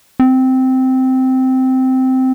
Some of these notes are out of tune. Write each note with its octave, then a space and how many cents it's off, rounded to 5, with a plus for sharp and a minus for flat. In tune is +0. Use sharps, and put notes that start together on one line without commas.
C4 -10